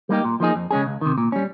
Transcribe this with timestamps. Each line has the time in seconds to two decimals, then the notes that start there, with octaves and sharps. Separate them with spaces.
0.09 G3 A#3 D#4 G4
0.25 A#2
0.40 F3 A#3 D#4 G#4
0.56 F2
0.71 C#3 G#3 C#4 G#4
0.86 C#2
1.01 C3 D#3
1.18 A#2
1.32 G3 C#4